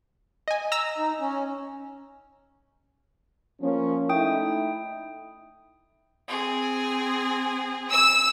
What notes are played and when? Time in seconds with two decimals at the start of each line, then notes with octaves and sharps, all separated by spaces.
0.48 D#5 G#5
0.72 A#5 E6 A#6
0.98 D#4
1.21 C#4
3.61 F3 A#3 C#4
4.09 A3 D#4 E4 G5 D#6
6.27 C4 G#4
7.92 E6